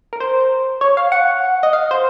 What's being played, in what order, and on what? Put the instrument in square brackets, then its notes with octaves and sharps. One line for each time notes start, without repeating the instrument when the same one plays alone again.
[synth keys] A#4
C5
C#5
F5
F#5
D#5
F5
C5